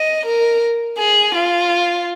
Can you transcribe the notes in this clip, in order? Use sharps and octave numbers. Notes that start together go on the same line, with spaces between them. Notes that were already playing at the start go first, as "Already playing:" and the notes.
Already playing: D#5
A#4
G#4
F4